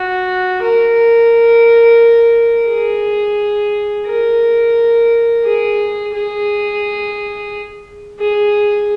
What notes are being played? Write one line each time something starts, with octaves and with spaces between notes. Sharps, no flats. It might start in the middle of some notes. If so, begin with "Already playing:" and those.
Already playing: F#4
A#4
G#4
A#4
G#4
G#4
G#4